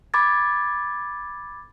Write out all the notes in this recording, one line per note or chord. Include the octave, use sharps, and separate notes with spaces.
B5 D6 G#6 A6